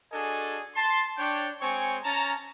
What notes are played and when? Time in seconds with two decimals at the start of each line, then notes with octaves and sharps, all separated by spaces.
0.12 D4 F#4 G#4 A4 D#5 G#5
0.75 A5 C6
1.18 D4 C#5 G5
1.61 G#3 C4 C#5 G5 G#5 C#6
2.03 C#4 A5 A#5